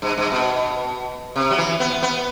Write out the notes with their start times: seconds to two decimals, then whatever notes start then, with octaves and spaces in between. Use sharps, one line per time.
0.02 G2
0.18 G2
0.32 B2
1.36 C3
1.51 F#3
1.58 E3
1.80 B3
2.03 B3